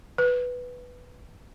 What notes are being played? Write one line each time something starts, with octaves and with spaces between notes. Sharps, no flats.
B4